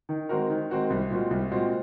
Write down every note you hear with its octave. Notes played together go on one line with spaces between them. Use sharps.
D#3
G#3 C4 F#4 A#4
D#3
G#3 C4 F#4 A#4
C2
A#2 G#3 C4 F#4
C2
A#2 G#3 C4 F#4